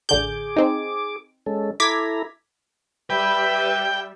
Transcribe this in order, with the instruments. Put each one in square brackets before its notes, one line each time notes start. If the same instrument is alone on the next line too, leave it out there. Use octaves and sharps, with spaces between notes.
[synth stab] A1 D3 G6 [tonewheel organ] G#4 D6
[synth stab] C4 D#4
[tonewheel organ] G#3 C#4 A4
[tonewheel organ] E4 A4 A#5 [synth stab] D6 G#6 B6
[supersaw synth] G3 [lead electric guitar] B4 [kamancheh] E5 [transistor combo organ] G5